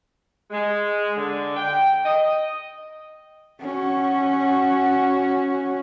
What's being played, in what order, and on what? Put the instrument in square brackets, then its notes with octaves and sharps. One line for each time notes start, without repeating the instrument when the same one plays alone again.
[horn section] G#3
D3
G5
D#5
[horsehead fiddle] C#4 F#4